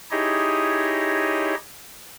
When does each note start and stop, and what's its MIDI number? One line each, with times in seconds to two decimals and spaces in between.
0.11 1.55 63
0.11 1.55 64
0.11 1.55 67
0.11 1.55 68
0.11 1.55 73
0.11 1.55 75